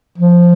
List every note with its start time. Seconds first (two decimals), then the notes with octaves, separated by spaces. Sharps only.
0.18 F3